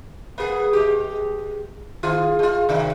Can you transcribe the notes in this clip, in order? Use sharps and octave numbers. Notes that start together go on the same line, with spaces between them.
A#3 B3 G#4
G#3 G4
D#3 F4 G#4
G#3 F4
C3 D#3 F#3